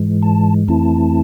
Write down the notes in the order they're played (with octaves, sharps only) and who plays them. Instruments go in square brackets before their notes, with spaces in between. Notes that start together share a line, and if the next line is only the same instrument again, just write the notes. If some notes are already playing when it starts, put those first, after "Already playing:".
Already playing: [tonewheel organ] G#2 E3 G#3
A5
F2 E3 A3 C4 E4 A5